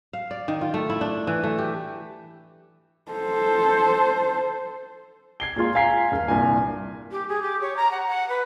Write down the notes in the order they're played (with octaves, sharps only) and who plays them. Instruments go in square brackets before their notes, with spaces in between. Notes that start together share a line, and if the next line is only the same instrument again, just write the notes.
[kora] F5
D5
D#3
F4
A3
E4
D4
E3
A3
G4
[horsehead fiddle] A4 C5
[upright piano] G#6 C7 G7
A#2 G#3 F4 C6
F5 G#5 A#5 G#6 B6 C7
D#1 F6
C2 G2 A#2 G#5 A#5
[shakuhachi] G4
G#4
G4
C#5
A#5
F#5
F#5
B4